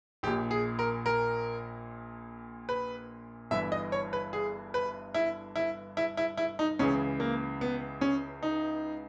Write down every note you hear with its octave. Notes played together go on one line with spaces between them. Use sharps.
A#1 A#2 G4
G#4
A#4
A#4
B4
G1 G2 E3 E5
D#5
C#5
B4
G#4
B4
E4
E4
E4
E4
E4
D#4
C#2 C#3 E3 C#4
A#3
B3
C#4
D#4